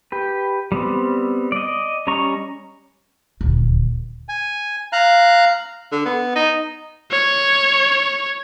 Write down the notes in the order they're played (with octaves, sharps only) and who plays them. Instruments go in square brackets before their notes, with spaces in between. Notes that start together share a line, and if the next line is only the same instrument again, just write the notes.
[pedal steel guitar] G4 B4
G3 B3 C4
D5 D#5
G3 C#4 D#5 A#5 C#6
[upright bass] D#1 D2
[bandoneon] G#5
F5 A#5 F#6
[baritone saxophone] D3
B3
D#4
[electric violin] C#5